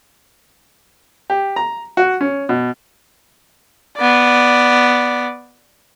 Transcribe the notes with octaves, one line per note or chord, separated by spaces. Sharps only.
G4
A#5
F#4
C#4
B2
B3 D5